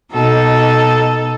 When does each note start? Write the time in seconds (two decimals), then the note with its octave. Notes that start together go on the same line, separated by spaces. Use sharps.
0.11 B2 D#4 A4